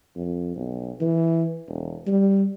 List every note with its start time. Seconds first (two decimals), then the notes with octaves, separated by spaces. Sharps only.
0.16 F2
0.56 B1
1.01 E3
1.68 E1
2.07 G3